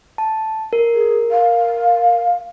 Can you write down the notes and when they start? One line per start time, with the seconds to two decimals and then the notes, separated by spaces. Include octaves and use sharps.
0.18 A5
0.73 A#4
0.94 G#4
1.31 F5